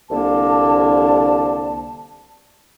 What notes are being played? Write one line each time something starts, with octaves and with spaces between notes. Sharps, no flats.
C2 D3 A#3 A5